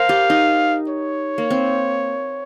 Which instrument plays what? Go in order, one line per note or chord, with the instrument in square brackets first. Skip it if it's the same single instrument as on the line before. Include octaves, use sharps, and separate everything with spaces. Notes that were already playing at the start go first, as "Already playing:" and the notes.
Already playing: [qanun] A#4 C5 [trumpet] F5
[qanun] G4
D#4
[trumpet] C#5
[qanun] A#3
C4